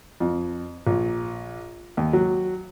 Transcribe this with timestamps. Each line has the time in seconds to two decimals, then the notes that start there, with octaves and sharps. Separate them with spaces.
0.20 F2
0.87 A#1
1.97 D#2
2.13 F#3